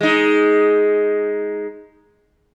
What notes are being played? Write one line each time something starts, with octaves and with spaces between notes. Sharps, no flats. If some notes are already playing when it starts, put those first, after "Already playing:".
G#3 D#4